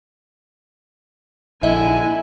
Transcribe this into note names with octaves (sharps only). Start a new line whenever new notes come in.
A#1 D3 E4 D#5 E5 G#5